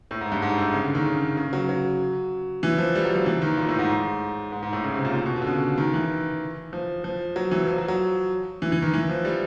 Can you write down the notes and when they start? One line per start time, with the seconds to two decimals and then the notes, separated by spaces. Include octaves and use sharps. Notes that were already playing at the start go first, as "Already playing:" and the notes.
0.11 A2
0.21 G#2
0.32 G2
0.42 G#2
0.58 A2
0.74 C#3
0.84 D3
0.95 D#3
1.05 C#3
1.37 C#3
1.53 F#3
1.69 F#3
2.63 E3
2.78 F3
2.95 G3
3.05 F#3
3.16 F3
3.26 E3
3.42 D#3
3.57 A#2
3.69 A2
3.79 G#2
4.52 G#2
4.63 G#2
4.73 A2
4.84 C#3
4.94 C3
5.05 A#2
5.15 A#2
5.26 B2
5.36 B2
5.42 D3
5.47 C#3
5.78 D#3
5.94 E3
6.73 F3
7.04 F3
7.36 F#3
7.51 E3
7.67 F3
7.78 F#3
7.88 F#3
8.62 E3
8.72 E3
8.82 D#3
8.94 E3
9.09 F3
9.25 G3